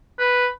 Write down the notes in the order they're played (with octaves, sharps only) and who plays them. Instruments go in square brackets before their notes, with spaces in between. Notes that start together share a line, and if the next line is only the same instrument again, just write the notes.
[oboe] B4